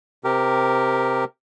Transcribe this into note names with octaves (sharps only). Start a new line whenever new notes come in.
C3 G4 A#4